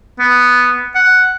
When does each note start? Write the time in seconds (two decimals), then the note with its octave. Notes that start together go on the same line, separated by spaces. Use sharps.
0.20 B3
0.95 F#5